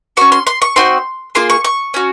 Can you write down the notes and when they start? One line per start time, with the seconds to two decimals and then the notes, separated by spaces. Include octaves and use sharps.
0.17 C#4 F#4 C#6
0.32 C6
0.47 C6
0.62 C#6
0.76 C4 D#4 F#4 C6
1.35 A#3 F4 G#4 C6
1.50 C#6
1.64 C#6
1.94 C#4 F#4